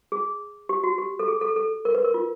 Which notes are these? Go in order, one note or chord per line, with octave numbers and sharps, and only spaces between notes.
G#4
G4
F#4
G4
A4
G#4
A4
A4
A#4
B4
A#4
F4